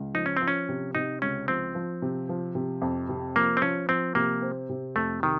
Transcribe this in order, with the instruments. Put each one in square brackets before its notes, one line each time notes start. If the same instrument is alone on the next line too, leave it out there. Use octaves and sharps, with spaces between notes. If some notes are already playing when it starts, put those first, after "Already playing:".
Already playing: [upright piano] C#2
[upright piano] F3 [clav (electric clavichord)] D#4
[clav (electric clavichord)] C#4
[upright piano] F3 [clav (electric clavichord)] C4
[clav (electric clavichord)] C#4
[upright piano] C3
[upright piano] C3 [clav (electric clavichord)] D#4
[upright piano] C#2 [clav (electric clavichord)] C#4
[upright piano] F3 [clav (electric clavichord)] C4
[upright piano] F3
C3
F3
C3
F2
C3
[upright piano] F3 [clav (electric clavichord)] A#3
[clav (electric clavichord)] C4
[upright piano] F3 [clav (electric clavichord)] C#4
[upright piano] F3 [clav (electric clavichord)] C4
[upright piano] C3 [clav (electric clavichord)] A#3
[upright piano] C4
C3
[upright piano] F2 [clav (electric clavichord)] A3
[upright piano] C3 [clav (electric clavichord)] D#3